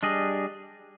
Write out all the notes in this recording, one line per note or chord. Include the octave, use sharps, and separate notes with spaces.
G3 D4 G#4 D#5